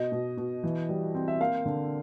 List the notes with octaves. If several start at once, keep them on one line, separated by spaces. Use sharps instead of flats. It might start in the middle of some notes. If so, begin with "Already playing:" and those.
Already playing: B2 D#5
B2
B2
E3
G3
C4
E5
A#3 F5
D3